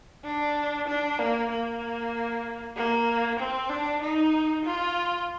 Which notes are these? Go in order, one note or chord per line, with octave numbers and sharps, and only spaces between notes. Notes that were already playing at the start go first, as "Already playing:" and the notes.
D4
D4
A#3
A#3
A#3
C4
D4
D#4
F4